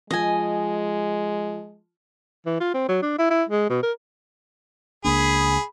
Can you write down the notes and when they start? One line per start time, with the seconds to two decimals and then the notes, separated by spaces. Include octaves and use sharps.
0.11 F3 G#3 D#5 G#5
2.46 E3
2.60 F4
2.74 C4
2.89 F#3
3.02 D4
3.19 E4
3.31 E4
3.49 G#3
3.70 B2
3.83 A#4
5.05 C#2 A#3 D4 G#4 B5